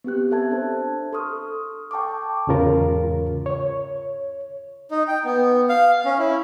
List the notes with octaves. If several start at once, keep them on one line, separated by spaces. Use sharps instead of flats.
B3 C4 G4 F#6
A4 E5 A5 G#6
D4 C5
A4 C6 C#6 D#6 F6
G5 A5 C#6 D6
E2 G#2 C#3 F4 A#4
C#5
D#4
G5
B3
F5
C#4
E4